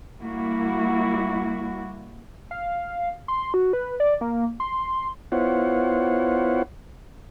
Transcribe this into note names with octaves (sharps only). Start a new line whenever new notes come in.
G3 A#3 E4 F#4
F5
C6
F#4
B4
D5
A#3
C6
B3 E4 F4 C5 C#5 F#5